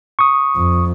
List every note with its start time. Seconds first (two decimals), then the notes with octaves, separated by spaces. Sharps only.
0.19 C#6 D#6
0.56 F2